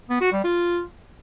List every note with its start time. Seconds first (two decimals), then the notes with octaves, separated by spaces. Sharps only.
0.10 B3
0.21 F#4
0.33 G3
0.44 F4